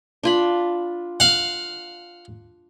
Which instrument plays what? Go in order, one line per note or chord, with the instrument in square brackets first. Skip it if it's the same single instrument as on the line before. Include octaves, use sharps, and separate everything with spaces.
[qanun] D4 F4 B5
[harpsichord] F5 F#5